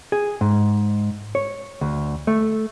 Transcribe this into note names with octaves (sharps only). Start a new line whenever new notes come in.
G#4
G#2
C#5
D2
A3